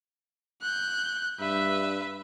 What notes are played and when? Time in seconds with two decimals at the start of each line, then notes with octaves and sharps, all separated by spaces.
0.62 F#6 G6
1.40 G2 B4 E5